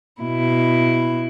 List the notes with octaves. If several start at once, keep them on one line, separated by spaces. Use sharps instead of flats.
B2 E4